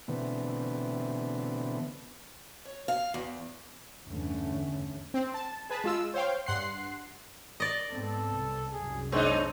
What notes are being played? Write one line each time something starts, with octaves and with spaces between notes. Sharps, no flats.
B2 D3 E3 A3 B3 C4
C#5
F5
E2
E2 G2 D3 E3 A3 C#4
C4
A5
G#4 B4 A5
G#3 F4 E6
C5 C#5 F5 G5
G2 F#5 C6 F#6 C7
D5 D#5
G#2 B3 C4 A4
C2
C2 F#2 G#4
G#3 C4 D4 D#4 C#5